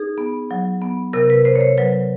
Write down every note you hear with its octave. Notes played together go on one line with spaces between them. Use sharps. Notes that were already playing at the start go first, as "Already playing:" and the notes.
Already playing: D#4 G#4
B3
F#3
B3
C3 A#4
B4
C3 C5
C#5
C5
F#3 B4